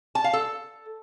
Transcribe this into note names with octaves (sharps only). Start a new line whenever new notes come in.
A5
F5
A4